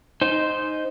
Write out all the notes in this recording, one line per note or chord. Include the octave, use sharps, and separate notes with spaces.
D#4 C5